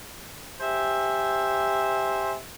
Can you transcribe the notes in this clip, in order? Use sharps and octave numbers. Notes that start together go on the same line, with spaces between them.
G4 C5 E5 G#5